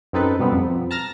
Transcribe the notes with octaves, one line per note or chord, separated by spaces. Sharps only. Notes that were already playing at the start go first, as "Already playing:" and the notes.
F#2 C4 D#4 A4 B4
B2 G3 B3 C4
F2
A5 A#5 F6 A6 A#6